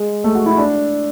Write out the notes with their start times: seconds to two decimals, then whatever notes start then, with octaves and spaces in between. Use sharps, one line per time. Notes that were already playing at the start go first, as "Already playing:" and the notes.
Already playing: G#3
0.24 A3
0.35 F#4
0.46 E4
0.58 D4